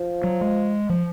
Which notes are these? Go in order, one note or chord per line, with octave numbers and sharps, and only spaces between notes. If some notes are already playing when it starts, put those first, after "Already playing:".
Already playing: F3
F#3
G#3
F3